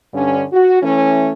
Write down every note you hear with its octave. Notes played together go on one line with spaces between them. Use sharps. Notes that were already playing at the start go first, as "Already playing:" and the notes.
G2 D3 C#4
F#4
E3 A3 C#4